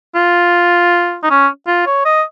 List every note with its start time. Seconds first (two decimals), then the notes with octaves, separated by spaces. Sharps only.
0.15 F4
1.23 D#4
1.30 C#4
1.67 F4
1.86 C#5
2.05 D#5